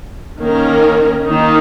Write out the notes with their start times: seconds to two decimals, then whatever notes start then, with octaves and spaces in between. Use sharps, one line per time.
0.40 D#3 A#3 C#4 A#4
1.26 D#3 A#3 D#4